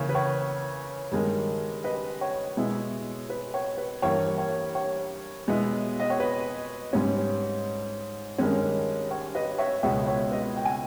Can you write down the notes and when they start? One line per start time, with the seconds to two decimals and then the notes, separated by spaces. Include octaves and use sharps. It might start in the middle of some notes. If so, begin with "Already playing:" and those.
Already playing: C#3 E3 A#3 C#4 C#5
0.09 B4
0.15 C#5
1.11 G2 D#3 G#3
1.84 B4 D#5
2.21 C#5
2.57 B2 G#3 B3 E4
3.30 B4
3.54 C#5
3.78 B4
4.02 G2 E3 A#3 C#5
4.38 C#5
4.75 C#5
5.47 B2 G#3 B3 E4
6.00 D#5
6.10 C#5
6.20 B4
6.93 G#2 G3 C#4
8.38 G2 D#3 G#3 C#4
9.11 C#5
9.35 B4 D#5
9.51 D#5
9.58 C#5 E5
9.83 C#2 B2 G#3 B3 C#5 E5
10.07 C#5
10.31 B4 D#5
10.56 G5
10.65 G#5